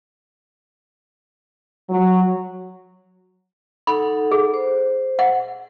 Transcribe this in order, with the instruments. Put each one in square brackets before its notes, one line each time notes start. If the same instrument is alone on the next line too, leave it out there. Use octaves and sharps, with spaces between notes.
[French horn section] F#3
[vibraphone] D#4 A4 F#5 [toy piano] B5
[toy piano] G#4
[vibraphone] C5
[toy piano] F#5